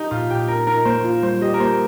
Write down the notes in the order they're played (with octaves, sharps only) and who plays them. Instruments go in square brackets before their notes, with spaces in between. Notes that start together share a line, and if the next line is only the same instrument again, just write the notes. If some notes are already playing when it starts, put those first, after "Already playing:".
Already playing: [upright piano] D#4 G4
[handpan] A#2 [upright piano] F4
[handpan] A#2 [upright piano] G4
[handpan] D#4 [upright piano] A#4
[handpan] D#4 [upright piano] A#4
[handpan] A#3 [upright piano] C5
[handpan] F4
[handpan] G3 [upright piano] C5
[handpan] G4 [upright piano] D#5
[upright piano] A#4
[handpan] A#3 [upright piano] C5